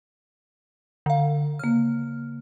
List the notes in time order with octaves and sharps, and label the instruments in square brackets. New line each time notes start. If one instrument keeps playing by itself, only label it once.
[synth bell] D3 F5
[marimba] C#3 A#3 [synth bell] F6